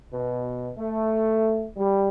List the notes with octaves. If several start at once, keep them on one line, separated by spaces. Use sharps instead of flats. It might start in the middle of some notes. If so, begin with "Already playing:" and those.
B2
A3
G3